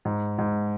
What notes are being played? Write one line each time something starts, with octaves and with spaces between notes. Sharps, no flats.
G#2
G#2